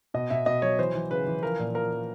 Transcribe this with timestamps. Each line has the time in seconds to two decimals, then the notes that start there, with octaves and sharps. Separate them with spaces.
0.14 B2 D#5
0.30 B2 E5
0.46 B2 D#5
0.62 F#3 C#5
0.78 E3 C5
0.94 E3
1.11 C#3 B4
1.27 E3
1.43 F3 A#4
1.59 A#2
1.74 F3 A#4
1.91 F3